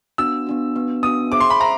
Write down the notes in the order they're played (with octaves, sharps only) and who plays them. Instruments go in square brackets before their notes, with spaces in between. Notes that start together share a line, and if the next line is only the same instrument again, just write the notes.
[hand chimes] B3 D4 F#4 [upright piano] E6
[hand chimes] B3 D4 F#4
B3 D4 F#4
[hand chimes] B3 D4 F#4 [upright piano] D#6
[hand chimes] G#4 C5 E5 [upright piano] D6
[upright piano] C6
B5
[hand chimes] C5 E5 [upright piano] A#5